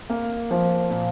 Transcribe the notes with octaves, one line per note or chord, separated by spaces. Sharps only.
A#3
F3
A#2